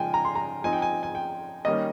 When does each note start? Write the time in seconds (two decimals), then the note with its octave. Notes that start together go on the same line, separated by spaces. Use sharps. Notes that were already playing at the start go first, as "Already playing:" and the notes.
Already playing: C#3 F3 G#3 G5 G#5
0.14 A#5
0.25 C6
0.35 A#5
0.64 F3 C4 D#4 G#5
0.73 G5
0.82 G#5
1.03 G#5
1.15 G5
1.65 D#3 G3 A#3 C#4 D#5